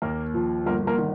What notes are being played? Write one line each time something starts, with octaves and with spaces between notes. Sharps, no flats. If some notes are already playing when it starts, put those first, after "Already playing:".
D#2 A#3 A#4
F3
G1 A#3 A#4
A#3 A#4
D#3